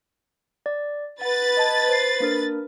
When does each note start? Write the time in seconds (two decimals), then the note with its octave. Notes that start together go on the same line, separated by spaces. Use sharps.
0.66 D5
1.21 B4 F#5 A6
1.57 D#5 A5 G#6
1.89 C5 C7
2.20 A#3 D4 A#4